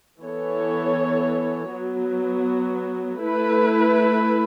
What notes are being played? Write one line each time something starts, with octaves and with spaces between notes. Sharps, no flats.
E3 B3 A4 C#5
F#3 B3 F#4
A3 E4 B4